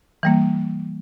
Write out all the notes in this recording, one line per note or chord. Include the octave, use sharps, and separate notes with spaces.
E3 G3 A#3